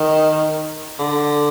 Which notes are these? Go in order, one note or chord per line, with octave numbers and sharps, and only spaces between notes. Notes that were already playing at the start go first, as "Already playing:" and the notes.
Already playing: D#3
D3